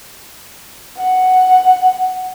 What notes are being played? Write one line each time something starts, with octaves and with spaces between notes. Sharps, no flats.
F#5